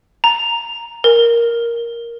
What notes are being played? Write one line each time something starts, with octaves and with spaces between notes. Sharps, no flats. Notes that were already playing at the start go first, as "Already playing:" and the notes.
A#5
A#4